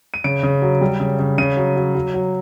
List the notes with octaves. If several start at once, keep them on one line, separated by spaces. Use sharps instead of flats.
D#7
C#3 D7
C#3
F#3
G3
C#3
C#3
C#3 D#7
F#3
F#3
F#3
F#3